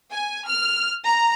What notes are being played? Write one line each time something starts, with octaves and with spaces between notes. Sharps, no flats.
G#5
F6
A#5